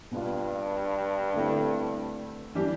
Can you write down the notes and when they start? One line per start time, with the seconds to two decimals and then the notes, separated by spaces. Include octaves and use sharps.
0.11 G2 B2 B3 D4 F4
1.33 D3 A3 C4 E4
2.55 E3 G3 D4 G4